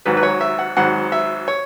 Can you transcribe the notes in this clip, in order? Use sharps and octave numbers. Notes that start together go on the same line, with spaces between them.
G#1 G#2 F#3 B4
B4
C#5
E5
F#5
G#1 G#2 F#3 F#5
E5
C#5